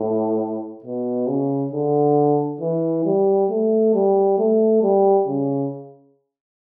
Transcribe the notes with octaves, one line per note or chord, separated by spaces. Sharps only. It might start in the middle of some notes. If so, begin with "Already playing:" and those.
Already playing: A2
B2
C#3
D3
E3
G3
A3
G3
A3
G3
C#3